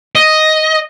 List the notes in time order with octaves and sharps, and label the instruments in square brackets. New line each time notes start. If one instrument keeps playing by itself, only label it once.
[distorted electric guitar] D#5